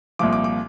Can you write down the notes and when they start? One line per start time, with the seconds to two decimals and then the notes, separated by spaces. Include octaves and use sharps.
0.19 C2 A#2 F3 D6
0.33 D6
0.44 D6